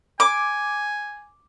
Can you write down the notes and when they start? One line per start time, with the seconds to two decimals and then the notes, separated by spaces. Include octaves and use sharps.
0.20 G#5 D6